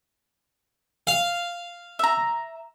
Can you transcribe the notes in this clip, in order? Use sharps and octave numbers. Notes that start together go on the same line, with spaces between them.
F5
E5 A#5